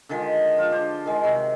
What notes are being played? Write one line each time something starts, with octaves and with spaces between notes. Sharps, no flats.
D3 D#3 F3 G#3
F4
D4 C5
D#3 G#3
C3 F#3